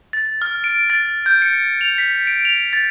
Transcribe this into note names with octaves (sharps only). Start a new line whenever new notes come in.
A6
F6
D7
A6
G6
C#7
F7
B6
D7
F7
A6